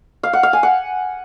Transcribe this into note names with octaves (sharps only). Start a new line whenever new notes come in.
F5
F#5
F5
G#5
F#5